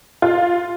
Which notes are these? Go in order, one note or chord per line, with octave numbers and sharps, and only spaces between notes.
F4